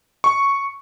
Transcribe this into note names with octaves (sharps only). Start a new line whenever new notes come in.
C#6